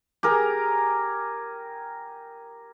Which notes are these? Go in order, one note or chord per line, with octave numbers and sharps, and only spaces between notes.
G4 G#4 A#4